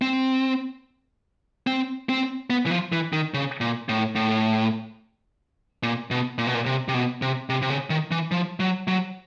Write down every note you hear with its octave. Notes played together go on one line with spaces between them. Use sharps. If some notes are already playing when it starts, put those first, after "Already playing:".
C4
C4
C4
B3
E3
F3
E3
D#3
C#3
A#2
A2
A2
A#2
B2
A#2
B2
A#2
C3
C3
B2
C3
C3
C3
C#3
D#3
E3
F3
F#3
F#3